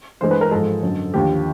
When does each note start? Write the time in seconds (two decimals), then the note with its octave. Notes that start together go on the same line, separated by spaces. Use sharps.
0.21 G2 E3 G#3 C5
0.31 B4
0.41 A#4
0.51 G#2 F3 G#3 A4
0.82 F#2 D3 F#3
1.14 D#2 D3 F3 G4